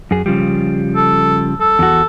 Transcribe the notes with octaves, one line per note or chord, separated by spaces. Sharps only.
F#2 G#4
C#3 F3 G3
A4
A4
E2 F#4